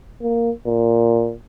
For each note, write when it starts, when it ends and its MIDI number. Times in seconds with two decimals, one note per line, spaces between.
0.22 0.51 58
0.66 1.34 46